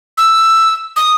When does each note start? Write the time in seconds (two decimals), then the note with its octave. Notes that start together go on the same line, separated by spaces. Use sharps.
0.18 E6
0.96 D#6